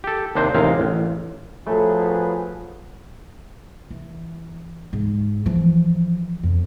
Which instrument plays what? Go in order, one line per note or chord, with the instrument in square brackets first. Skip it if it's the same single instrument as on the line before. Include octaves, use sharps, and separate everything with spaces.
[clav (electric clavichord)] G4 A4
D#2 C3 D4 C5 D5 D#5
A1 D#2 C3 G#3 F5
A1
[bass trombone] F3 [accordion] F#3 G#4 B4 [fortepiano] A3
[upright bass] E3
G#2
E3 F3
F2